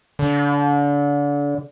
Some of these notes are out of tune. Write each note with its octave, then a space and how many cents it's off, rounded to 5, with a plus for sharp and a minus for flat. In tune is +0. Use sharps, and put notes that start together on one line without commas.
D3 -30